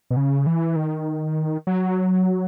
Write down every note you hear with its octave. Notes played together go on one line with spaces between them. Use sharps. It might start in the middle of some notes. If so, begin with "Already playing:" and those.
B2
C#3
E3
D#3
F#3